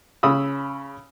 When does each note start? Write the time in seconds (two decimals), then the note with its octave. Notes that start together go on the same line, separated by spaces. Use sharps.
0.23 C#3 B5 D#6 E6